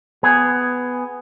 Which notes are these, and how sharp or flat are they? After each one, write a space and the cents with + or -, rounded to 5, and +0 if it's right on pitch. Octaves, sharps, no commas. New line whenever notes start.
B3 +10 G#4 +0